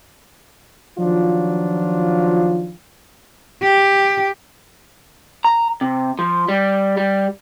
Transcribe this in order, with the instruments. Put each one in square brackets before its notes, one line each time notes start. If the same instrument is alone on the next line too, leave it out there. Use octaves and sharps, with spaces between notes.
[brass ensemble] D#3 F3 F#3 D4 F4
[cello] G4
[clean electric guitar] A#5
C3
F3
G3
G3